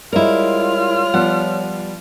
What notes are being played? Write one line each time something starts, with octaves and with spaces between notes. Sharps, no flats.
G3 G#3 E4 F4 A#4 C#5 F6
F3 G3 B3 F#5